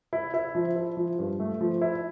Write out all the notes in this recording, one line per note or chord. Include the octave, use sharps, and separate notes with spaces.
E4
E4
F3
E4
F3
G2
A3
F3
E4